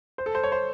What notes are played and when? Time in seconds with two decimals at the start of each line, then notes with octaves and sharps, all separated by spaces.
0.18 C5
0.26 A4
0.35 C5
0.43 C#5
0.52 C5